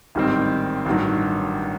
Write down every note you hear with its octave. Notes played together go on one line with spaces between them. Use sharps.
A1 G#2 D#3 G3 C4
A1 G2 D#3 F#3